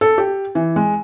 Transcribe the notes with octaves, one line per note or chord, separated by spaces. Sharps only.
A4
G4
E3
G#3